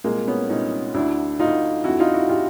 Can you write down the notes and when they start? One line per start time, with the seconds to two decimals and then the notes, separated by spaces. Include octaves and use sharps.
0.04 C2 A#2 G#3 A#3
0.28 B3 C#4
0.49 C2 A#2 C#4 D#4
0.94 D2 D3 D4 E4
1.39 D2 D3 D#4 F4
1.84 F2 D3 E4 F#4
2.00 D#4 F4
2.14 E4 F#4
2.29 D3 F4 G4